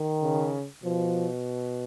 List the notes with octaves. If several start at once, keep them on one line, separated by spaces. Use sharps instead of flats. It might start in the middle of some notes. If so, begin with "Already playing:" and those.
Already playing: D#3
C#3
B2 F3